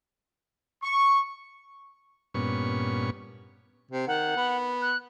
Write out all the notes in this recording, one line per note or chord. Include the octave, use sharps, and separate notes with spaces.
C#6
G2 A#2 B3 C#4 C#6
C3
D#3 F#5
B3
F#6